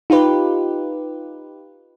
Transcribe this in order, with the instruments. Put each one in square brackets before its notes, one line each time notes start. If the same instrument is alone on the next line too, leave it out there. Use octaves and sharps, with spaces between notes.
[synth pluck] D#4 F4 G4 B4